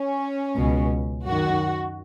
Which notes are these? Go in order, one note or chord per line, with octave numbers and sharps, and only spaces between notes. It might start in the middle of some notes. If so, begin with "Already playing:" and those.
Already playing: C#4
C#2 B2
F#2 D#3 F#4